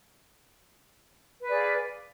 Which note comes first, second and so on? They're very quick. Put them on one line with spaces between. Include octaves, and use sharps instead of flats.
B4 D5 G#4 F5